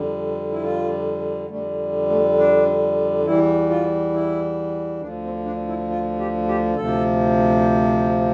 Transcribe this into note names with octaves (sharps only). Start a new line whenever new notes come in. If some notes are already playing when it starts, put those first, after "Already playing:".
Already playing: F2 D3 G3
E4
F4
F2 D3 G3 A3
A3
D4
E2 E3 G3 E4
F4
E4
D2 D3 F3 D4
C4
D4
E4
F4
G4
G4
D2 C3 F3 A4